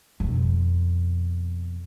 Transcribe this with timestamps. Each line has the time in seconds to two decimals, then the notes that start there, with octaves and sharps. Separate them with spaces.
0.20 F2 B2